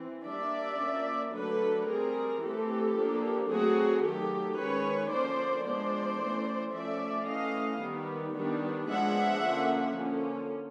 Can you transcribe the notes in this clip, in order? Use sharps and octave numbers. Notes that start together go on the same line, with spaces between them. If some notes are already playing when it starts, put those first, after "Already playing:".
Already playing: E3 C4
G3 A#3 D4 D5 E5
F3 A#3 C#4
D3 F#3 A3 D4 A4 B4
G3 C4 G#4 A#4
E3 A3 C4 G4 A4
F3 A#3 D4
F#3 A3 C4 F#4 G#4
D#3 F#3 A3 G4 A4
D#3 G#3 C#4 B4 C#5
D3 F3 A#3 C#4 C5 D5
F3 G#3 B3 D4 C5 D5
E3 A3 C#4
F3 A3 C#4 D5 E5
E3 A3 C#4 D#5 F5
D#3 G3 B3
D#3 G3 B3 D4
F3 G#3 B3 D4 E5 F#5
D3 F3 A#3 C#4
D3 F3 A#3 C#4